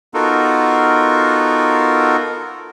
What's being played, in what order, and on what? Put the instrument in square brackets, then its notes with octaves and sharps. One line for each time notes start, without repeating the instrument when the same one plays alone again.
[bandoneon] B3 D#4 F4 F#4 A4 A#4